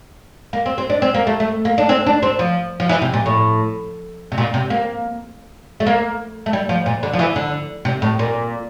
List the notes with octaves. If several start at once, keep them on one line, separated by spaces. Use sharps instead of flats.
A#3
C4
C4
D4
C4
A#3
A3
A3
A#3
D4
C4
D4
C4
F3
F3
E3
C3
A#2
A2
C3
A#2
C3
A#3
A3
A#3
A3
G3
F3
A#2
D3
F3
E3
D3
C3
A2
A#2